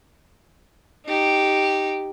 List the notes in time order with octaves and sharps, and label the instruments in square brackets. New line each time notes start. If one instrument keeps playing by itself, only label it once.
[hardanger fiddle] D#4 G4